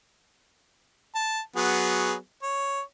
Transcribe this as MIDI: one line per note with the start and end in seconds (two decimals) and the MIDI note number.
1.15 1.40 81
1.56 2.14 54
1.56 2.14 59
1.56 2.14 68
2.43 2.81 73